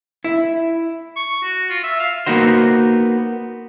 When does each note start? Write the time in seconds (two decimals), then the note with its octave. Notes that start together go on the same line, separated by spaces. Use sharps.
0.24 E4
1.16 C#6
1.43 F#4
1.69 F4
1.83 E5
2.00 F5
2.26 A#3 B3 D#4 F#4 C5